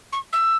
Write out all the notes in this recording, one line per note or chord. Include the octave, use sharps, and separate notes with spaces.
C#6
E6